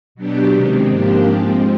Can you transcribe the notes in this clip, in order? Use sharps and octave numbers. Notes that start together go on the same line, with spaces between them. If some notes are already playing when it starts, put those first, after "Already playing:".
B2 F#3 B3 D4 G4
C3 D#3 G#3 C4
G#2 F3 A#3 D4 G4
F3 G#3 C4